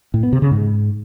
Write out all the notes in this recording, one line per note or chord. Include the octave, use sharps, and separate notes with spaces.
A2
B3
C3
C#3
G#2